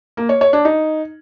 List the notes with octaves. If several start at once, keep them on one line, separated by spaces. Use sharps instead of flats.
A#3
C#5
C#5
D4
D#4